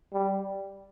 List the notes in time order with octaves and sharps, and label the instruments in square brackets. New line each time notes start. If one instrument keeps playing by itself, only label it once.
[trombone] G3